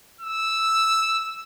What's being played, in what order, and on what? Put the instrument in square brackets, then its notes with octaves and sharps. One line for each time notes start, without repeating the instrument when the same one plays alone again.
[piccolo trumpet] E6